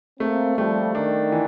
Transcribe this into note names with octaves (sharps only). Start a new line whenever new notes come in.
A3 A#3 C4
F3 G3 A3
D#3 D4
E3